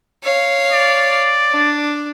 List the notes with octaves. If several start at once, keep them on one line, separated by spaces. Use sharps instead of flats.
C#5 F5
D5
D4